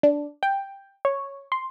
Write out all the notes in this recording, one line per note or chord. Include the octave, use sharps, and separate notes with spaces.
D4
G5
C#5
C6